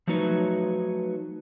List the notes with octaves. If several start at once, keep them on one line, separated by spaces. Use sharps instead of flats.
F3 F#3 A3 D#4 B4 C#5